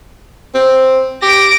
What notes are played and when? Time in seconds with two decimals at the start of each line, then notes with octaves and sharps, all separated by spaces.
0.54 C4
1.22 G4 A#6 D7